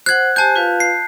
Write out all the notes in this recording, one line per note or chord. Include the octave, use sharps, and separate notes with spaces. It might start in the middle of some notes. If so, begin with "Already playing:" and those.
C5 F#5 F#6 G#6
G4 C5 G#5 A5 G6
F4 B4 F5
C7